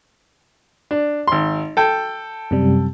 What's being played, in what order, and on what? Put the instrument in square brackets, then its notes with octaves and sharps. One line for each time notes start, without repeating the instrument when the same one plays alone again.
[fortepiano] D4
G#1 C6
A4 G5
[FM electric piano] F#2 C3 G3